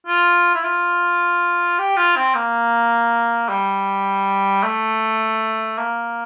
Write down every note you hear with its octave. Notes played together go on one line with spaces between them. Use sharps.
F4
E4
F4
G4
F4
C4
A#3
G3
A3
A#3